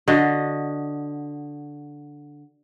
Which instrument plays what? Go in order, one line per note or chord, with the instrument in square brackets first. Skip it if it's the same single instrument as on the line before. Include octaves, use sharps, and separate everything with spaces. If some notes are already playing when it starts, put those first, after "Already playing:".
[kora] D3 F#4 D#5